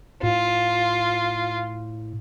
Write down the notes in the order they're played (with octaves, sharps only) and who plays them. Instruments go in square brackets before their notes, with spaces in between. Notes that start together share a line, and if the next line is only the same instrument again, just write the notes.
[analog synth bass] A2 [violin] F4